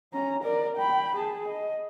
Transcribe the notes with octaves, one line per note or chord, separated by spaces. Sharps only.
C#4 A#5
A#4 D5
G5 B5
G#4 A5
D#5